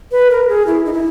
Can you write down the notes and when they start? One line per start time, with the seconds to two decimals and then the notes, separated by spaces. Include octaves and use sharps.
0.12 B4
0.30 A#4
0.48 G#4
0.66 E4
0.85 D#4
0.93 E4